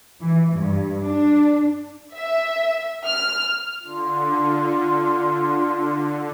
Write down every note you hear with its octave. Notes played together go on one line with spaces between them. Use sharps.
E3
G2
D4
E5
F6
D3 F4